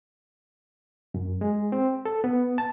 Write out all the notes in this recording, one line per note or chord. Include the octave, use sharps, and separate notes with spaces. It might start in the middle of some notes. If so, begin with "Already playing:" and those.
F#2
G#3
C4
A4
B3
A5